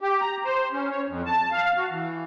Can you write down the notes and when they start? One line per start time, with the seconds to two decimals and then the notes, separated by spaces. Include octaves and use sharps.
0.01 G4
0.21 A#5
0.45 C5
0.72 C#4
0.90 C#5
1.08 F2
1.26 A5
1.52 F5
1.77 F#4
1.90 E3